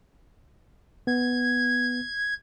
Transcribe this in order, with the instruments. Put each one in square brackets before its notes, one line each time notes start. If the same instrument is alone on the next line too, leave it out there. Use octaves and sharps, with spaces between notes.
[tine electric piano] B3 [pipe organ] G#6